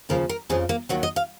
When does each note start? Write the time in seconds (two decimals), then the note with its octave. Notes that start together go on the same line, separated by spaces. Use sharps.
0.09 D#2 C#3 F3 A#4
0.29 A#4
0.49 F2 C#3 F3 G#4
0.69 A#3
0.89 D#2 D#3 F#3 F#4
1.03 D#5
1.16 F5